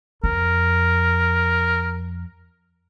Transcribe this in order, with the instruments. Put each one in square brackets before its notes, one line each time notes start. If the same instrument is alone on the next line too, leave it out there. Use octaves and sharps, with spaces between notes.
[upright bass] F2 [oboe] A#4